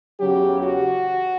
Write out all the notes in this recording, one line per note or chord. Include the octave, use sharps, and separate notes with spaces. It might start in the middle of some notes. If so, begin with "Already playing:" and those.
E2 C#3 F#3 G4
F#4